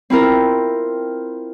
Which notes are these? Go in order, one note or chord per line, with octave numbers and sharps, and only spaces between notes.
C4 E4 F4 A#4